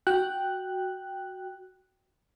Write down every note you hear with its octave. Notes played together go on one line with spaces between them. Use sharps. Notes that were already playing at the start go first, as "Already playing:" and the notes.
F#4 G5 F#6